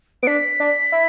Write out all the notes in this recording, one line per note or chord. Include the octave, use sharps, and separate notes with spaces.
B3 D7
D4 B6
D4
E4